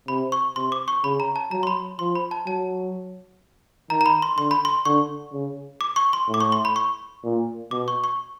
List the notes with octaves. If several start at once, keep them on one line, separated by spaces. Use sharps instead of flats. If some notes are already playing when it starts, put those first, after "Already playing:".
C3 B5
C#6
C3 C6
D6
C#6
C#3 B5
A#5
A5
F#3 A#5
C6
B5
F3 C6
B5
A5
F#3 A5
D#3 A#5
A#5
B5
C6
D3 C6
B5
C6
D3 C#6
C#3
D6
C#6
C6
A2
D6
C#6
C6
B5
C#6
A#2
B2 D6
C#6
C#6